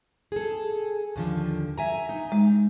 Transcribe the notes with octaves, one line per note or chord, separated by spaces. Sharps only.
G#4 A4
D#2 D3 F3
E5 G#5 A#5
D#4
G#3